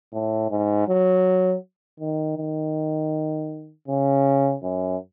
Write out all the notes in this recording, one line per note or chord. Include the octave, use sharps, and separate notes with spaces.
A2
G#2
F#3
D#3
D#3
C#3
F#2